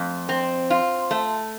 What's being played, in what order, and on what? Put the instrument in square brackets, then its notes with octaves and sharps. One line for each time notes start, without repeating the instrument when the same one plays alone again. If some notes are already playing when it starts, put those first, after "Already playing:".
Already playing: [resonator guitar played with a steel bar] F2 A3
C4
F4
A3